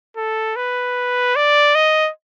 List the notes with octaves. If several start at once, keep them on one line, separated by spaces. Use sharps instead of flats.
A4
B4
D5
D#5